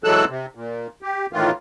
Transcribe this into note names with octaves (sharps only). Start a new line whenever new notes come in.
E3 F#3 G#3 A4 E6 F#6
C3
A#2
G4
A2 D#3 E3 F4